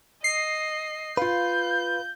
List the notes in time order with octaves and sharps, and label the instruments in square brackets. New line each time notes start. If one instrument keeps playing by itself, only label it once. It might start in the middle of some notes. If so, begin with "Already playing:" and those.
[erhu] D#5 [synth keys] C7
[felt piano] F4 F5 [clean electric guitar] B4 [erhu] G6